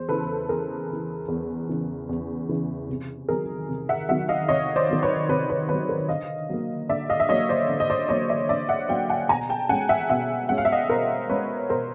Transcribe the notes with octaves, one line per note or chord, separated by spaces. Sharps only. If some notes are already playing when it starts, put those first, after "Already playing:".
Already playing: E2 C5
C#3 E3 A4 B4
E2 G#4 A#4
C#3 E3
E2
C#3 E3
E2
C#3 E3
C3
D#3 F#3 G#4 A#4
C3
E5 F#5
D#3 F#3 E5 F#5
D#5 F5
C3 C#5 D#5
C5 D5
D#3 F#3
B4 C#5
C3 B4 C#5
B4 C#5
D#3 F#3 B4 C#5
A#4 C5
D3 D#5 F5
F#3 A#3
D3 D5 E5
D#5 F5
E5
F#3 A#3 C#5 D#5
C5 D5
D3
D#5
C5 D5
F#3 A#3 C#5 D#5
D5 E5
D3 D5 E5
E5 F#5
F#3 A#3 F5 G5
F#5 G#5
B2 G#5 A#5
G5 A5
G#3 C#4 F#5 G#5
E5 F#5
B2 E5 F#5
G#3 C#4 F#5
F5
E5
D#5 F5
B2 A#4 C5
G#3 C#4 B4 C#5
B2 A#4 C5